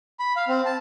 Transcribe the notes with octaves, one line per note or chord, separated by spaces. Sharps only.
B5
F5
C4
A5